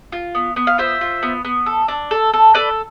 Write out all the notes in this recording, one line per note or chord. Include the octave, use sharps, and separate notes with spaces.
F4
B3
B3
F5
F4 C5 E5
F4
B3
B3
A4
D4
A4
A4
A4 B4 D5